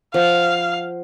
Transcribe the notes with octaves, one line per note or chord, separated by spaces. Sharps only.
F3 F5 F#5